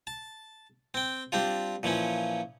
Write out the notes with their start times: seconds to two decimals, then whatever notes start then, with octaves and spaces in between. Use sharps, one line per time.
0.07 A5
0.94 C4 G5
1.32 G3 C4 D4 F4
1.83 A#2 E3 F3 C#4